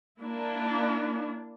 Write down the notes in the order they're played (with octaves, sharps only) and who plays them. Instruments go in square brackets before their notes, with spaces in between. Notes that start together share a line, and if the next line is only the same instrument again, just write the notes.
[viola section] A#3 D4 E4